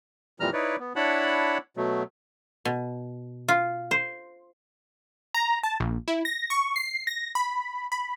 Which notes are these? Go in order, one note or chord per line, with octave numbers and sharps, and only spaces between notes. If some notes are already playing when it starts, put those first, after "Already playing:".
F2 A#2 E3 G3 A#5 F6
D#4 E4 B4 C#5 D5
B3
D4 E4 C#5 F#5 A5 B5
B2 F#3 A3
B2
F4
C5
A#5
A5
A#1
E4
A#6
C#6
C7
A#6
B5
B5